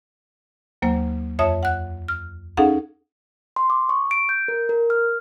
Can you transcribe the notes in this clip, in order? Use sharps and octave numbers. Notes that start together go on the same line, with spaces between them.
D#2 F#3 A#3 C5
F2 C#5 E5 D#6
F#5 F#6
F6
C#4 D#4 G#4 A4 F5 F#5
C6
D6
C#6
D7
G6
A#4
A#4
F6